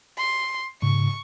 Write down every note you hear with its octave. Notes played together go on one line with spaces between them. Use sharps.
C6
G#2 C#3 C#6